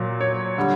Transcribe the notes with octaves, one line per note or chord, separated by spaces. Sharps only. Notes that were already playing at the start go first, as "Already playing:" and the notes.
Already playing: A#2 F#3
C#5
D3 G3